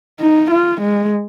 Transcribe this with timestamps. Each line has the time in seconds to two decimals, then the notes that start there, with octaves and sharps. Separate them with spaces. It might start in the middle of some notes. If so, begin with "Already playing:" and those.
0.20 D#4
0.51 F4
0.81 G#3